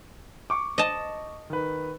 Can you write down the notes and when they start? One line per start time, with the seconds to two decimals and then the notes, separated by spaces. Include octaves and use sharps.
0.50 C#6 D6
0.78 D#5 A5
1.50 D#3 B4